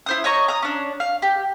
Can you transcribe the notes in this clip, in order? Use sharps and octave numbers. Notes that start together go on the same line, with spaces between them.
E4 C5 D#6
C#5 D#5 A#5 C#6
A#5 D#6
C#4 D4
F5
G4